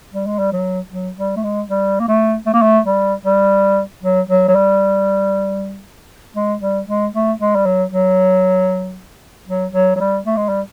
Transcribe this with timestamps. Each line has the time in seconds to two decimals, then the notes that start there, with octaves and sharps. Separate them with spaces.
0.14 G3
0.26 G#3
0.39 G3
0.53 F#3
0.91 F#3
1.17 G3
1.36 A3
1.43 G#3
1.70 G3
2.00 A#3
2.08 A3
2.46 A3
2.54 A#3
2.62 A3
2.86 G3
3.25 G3
4.03 F#3
4.29 F#3
4.48 F#3
4.55 G3
6.36 G#3
6.62 G3
6.88 G#3
7.14 A3
7.39 G#3
7.55 G3
7.66 F#3
7.92 F#3
9.48 F#3
9.73 F#3
9.96 F#3
10.00 G3
10.26 A3
10.37 G#3
10.49 G3